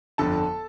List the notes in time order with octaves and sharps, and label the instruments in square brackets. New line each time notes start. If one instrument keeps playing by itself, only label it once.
[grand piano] G1 F2 D3 [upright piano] A4 A5